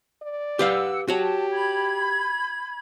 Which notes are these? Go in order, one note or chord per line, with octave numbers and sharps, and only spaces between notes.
D5
G4 B4 F5 F#5 E6
F#4 G4 C#5 A5
B5 G#6